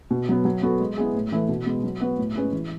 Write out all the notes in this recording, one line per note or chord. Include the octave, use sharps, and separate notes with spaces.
B2
F#3 B3
F#3
B3 F#4 A4
G#3
B3 E4 G#4
A2
E3 A3 E4 B4
B2
G#3 B3
F#3
B3 F#4 B4
A2
G#3 C#4 G#4 B4
E3